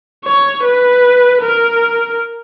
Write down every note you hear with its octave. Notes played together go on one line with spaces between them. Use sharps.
C#5
B4
A#4